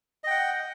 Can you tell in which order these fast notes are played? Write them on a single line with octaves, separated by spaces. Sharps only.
D#5 G5 F#5